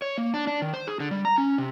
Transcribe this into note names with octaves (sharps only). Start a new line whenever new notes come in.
C#5
A#3
D4
D4
D#3
C5
G#4
D3
G3
A#5
C#4
C3